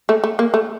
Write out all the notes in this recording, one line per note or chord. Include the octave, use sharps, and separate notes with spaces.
A3
A3
A#3
A3